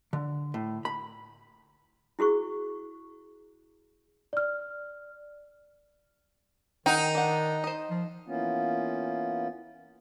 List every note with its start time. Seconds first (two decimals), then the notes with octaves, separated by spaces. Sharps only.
0.13 D3
0.54 A2
0.85 B5
2.19 E4 F#4 G#4 C#6
4.33 D5 F6
6.86 D#3 D#4 G#4 F#5 G5
7.15 D4 F#5
7.64 C5 D#5
7.90 F3
8.28 E3 A#3 B3 C#4 F4